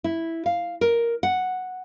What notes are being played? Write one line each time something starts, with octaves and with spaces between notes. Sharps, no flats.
E4
F5
A#4
F#5